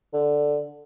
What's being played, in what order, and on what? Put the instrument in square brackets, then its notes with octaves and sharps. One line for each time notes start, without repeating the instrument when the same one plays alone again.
[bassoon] D3